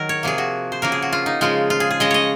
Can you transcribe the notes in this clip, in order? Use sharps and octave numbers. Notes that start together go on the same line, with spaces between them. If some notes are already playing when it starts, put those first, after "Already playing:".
Already playing: D#3 F#3 A#4
C#5
C3 F3 A#3 G#4
F#4
C5
C#3 F3 A#3 A#4
G#4
F#4
F4
D#4
C#3 F3 G#3 F4
F4
G#4
G#4
C#3 G#3 D#5
C#5 D#5